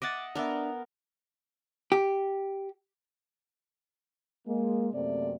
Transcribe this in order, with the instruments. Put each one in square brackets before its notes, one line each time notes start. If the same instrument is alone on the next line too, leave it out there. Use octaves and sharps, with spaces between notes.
[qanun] D#5 E5 F#5 [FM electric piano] D6 F#6 A6
[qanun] B3 A#4 [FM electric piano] D4 D5 E5
[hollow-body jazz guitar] G4
[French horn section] G#3 A#3
F#2 C3 A3 A#3 C4 D5